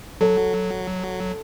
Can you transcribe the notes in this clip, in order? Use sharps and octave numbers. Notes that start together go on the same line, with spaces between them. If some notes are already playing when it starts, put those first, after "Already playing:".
F#3 A4